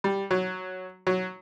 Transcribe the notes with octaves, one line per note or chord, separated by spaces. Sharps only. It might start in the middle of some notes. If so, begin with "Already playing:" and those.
G3
F#3
F#3